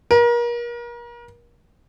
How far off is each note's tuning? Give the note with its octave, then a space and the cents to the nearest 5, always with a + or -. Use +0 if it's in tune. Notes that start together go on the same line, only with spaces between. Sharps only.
A#4 +35